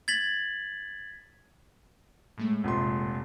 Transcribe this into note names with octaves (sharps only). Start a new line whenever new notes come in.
G#6 A6 B6 F#7
A2 G#3 A3
F1 A#1 C6